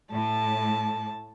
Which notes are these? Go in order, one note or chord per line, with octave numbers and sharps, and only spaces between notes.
A2 A5